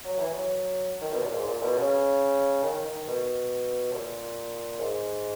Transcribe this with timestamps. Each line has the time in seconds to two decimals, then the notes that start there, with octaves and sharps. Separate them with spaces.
0.05 F#3
0.19 E3
0.34 F#3
1.01 D#3
1.13 B2
1.22 A#2
1.34 G#2
1.48 A#2
1.63 B2
1.78 C#3
2.63 D#3
2.85 D#3
3.07 B2
3.93 A#2
4.79 G#2